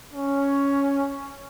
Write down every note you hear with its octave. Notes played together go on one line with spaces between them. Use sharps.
C#4